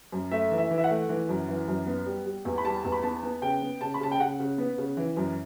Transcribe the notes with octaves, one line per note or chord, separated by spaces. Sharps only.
F#2
A3 E5
E3
E5
E3
E5
F#5
A3
E3
F#2
E3
F#2
B3
G3
G3
E2
B5
G3 A5
E2
B5
B3 A5
B3
C#3 G5
B3
C#3 A5
B5
C#3 A5
G5
C#3 F#5
C#3
B3
C#3
E3
F#2